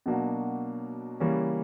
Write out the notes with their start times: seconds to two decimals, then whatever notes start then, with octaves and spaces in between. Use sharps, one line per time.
0.06 B2 F#3 A#3 D4 F#4
1.20 C#3 E3 G3 A#3 C#4